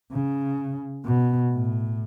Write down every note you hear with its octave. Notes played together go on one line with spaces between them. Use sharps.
C#3
B2
A2